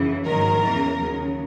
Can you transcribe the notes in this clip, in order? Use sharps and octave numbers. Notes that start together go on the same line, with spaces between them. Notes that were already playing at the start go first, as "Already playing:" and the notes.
Already playing: F#2 C#3 E3
A#1 G#2 D#3 F#3 A#4
E2 C#3 E3
D#2 C#3 F#3